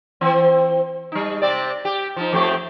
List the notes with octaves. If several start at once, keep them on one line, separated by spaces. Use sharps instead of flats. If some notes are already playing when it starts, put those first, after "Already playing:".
E3 C4
G3 D#4
C3 C4 D5
G4
F3 D#4
F2 A3 G4